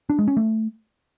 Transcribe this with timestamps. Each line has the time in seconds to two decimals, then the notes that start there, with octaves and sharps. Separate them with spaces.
0.10 D4
0.19 G#3
0.28 C#4
0.37 A3